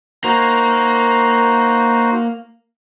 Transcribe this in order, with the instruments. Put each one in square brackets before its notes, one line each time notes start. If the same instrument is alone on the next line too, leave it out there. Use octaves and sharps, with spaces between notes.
[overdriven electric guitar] A#3 [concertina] D#4 F#4 C5